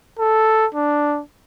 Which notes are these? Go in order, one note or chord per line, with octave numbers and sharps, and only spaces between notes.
A4
D4